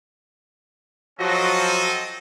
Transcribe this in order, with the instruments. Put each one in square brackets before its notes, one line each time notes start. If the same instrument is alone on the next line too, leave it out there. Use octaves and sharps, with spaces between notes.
[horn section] F3 F#3 F#4 [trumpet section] C4 A4 D#5